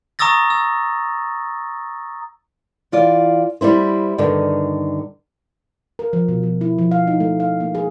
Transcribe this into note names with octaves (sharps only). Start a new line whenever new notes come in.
A#5 C#6 D#6 E6 A6 A#6
E6
E3 F4 D5
G3 C4 E4 C5
G2 D3 D#3
A#4
F3
B2
F3
E4
F3
F5
D#4
A3
F5
A#3
G#4